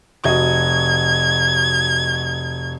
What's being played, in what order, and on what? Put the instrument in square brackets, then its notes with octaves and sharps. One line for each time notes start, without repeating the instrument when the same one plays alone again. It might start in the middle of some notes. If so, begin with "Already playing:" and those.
[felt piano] F1 F#4 D#5 [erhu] G#6